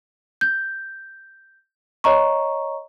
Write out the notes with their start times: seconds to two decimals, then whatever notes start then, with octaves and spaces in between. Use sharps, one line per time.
0.41 G6
2.04 C#5 D#5 A#5 C#6